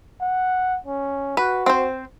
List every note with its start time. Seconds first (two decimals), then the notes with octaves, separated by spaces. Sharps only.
0.21 F#5
0.86 C#4
1.37 F#4 B4
1.66 C4 C5